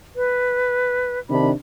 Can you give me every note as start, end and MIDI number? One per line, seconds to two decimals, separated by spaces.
0.16 1.19 71
1.30 1.51 48
1.30 1.51 51
1.30 1.51 62
1.30 1.50 83